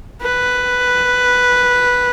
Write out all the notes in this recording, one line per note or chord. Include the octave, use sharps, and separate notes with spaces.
B4